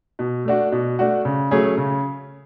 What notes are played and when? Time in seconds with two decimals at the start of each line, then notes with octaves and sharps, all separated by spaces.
0.19 B2
0.45 A3 D4 F#4
0.72 B2
0.99 A3 D4 F#4
1.25 C#3
1.51 F#3 A3 C#4 G#4
1.78 C#3